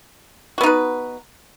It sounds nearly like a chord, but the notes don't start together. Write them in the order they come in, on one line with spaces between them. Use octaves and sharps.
F#4 B3 D#4 B4